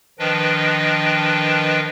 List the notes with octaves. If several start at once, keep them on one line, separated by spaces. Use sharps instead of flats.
D#3 F3 D4 B4 D#5 G5